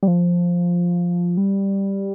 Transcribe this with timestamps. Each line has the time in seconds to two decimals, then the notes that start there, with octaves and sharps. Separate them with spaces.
0.03 G3
0.07 F3
1.37 G3